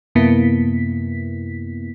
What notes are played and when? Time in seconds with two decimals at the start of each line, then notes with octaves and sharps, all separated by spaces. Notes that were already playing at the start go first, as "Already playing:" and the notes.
0.15 F#2 C3 A#3 B3 E4 B6